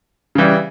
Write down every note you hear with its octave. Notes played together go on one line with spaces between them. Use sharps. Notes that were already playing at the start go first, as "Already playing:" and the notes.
C#3 E3 G3